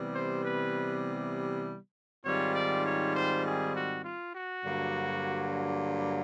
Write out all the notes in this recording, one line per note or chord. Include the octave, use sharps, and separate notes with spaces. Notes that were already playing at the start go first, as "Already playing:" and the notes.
Already playing: C3 E3 G3 B3
C5
B4
G#2 D#3 G3 C4 F4 C#5
D5
C#5
C5
G#4
F#4
F4
F#4
G2 D3 F#3 A#3